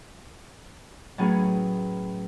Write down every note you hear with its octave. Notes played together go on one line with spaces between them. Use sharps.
A2 F#3 B3 C#4 G#4